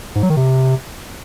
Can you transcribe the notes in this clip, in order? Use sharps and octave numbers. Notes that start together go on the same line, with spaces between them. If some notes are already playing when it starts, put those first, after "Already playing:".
G#2
F#3
D#3
C3